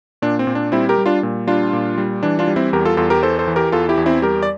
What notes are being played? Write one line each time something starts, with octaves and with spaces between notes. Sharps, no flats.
A#2 D4
C4
A#2
D4
G3 C4 E4
G4 A#4
G3
D4 F4
A#2
G3 D4 F4
A#2
G3
E3 D4
D4 F4
G3
C4 E4
E2 G4 A#4
F4 A4
E2 F4 A4
G4 A#4
E3 A4 C5
A4 C5
E3
G4 A#4
E2 F4 A4
E4 G4
E2
C4 E4
G3 G4 A#4
D5